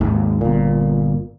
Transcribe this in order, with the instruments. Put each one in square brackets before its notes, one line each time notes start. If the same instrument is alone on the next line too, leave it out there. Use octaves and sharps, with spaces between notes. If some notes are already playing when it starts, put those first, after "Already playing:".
[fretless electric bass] G#1 D#2
G1 A#2